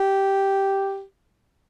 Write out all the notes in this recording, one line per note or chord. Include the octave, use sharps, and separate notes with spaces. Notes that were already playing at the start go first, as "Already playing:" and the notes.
Already playing: G4